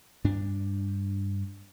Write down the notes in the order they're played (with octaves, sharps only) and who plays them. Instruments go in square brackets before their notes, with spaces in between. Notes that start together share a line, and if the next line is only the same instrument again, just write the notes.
[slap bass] G2 D4